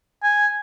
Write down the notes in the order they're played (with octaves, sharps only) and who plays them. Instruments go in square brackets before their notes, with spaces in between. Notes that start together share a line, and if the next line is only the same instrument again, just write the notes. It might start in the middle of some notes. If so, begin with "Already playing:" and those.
[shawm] G#5